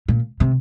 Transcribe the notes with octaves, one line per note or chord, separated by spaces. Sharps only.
A#2
C3